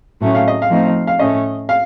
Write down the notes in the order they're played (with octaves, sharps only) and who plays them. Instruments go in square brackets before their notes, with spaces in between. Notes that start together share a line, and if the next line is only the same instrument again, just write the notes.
[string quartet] A2 F#3 A3 C#4
[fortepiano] F5
D#5
F5
[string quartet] F3 A3 C4 D#4
[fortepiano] F5
[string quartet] A2 A3 C#4 [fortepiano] D#5
[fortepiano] F5